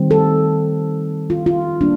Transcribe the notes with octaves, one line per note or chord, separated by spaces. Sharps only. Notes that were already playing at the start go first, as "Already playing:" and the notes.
Already playing: D#3 G3 C4
A4
F4
F4
G3 A#3 D4